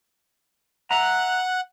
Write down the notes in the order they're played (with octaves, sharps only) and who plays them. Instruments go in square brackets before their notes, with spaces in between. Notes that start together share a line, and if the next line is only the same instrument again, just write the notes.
[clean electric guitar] E5 A#5 [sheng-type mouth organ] F#5 F#6